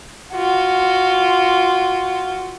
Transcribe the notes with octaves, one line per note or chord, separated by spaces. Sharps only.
F4 F#4